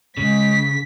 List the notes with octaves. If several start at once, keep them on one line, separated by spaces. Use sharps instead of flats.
C#3 G#3 B6